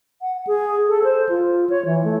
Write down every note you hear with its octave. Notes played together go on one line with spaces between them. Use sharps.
F#5
G#4
A4
C5
F4
C#5
E3
A3